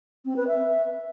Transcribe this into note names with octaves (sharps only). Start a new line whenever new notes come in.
C4
B4
E5